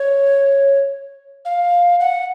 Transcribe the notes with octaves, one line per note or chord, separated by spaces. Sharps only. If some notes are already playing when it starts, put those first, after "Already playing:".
Already playing: C#5
F5
F#5